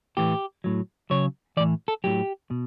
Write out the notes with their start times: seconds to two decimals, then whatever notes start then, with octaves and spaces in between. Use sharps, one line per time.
0.17 A2 E3 G4
0.64 A2 F#3
1.10 C#3 F#3 C#5
1.57 A2 E3 D5
1.88 A4
2.04 A2 F#3 G4
2.51 B2